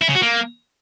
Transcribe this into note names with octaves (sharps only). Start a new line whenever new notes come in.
E4
C#3
F#4
A#3